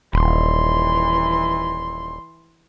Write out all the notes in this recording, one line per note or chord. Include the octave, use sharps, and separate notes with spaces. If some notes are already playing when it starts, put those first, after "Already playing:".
D#1 E3 C6